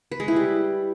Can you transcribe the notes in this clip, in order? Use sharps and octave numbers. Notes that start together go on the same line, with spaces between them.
B4
G#3
E4
G3